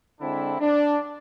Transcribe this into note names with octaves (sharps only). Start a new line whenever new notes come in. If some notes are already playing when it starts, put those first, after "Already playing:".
D3 G#3 C4 D4 E4
D4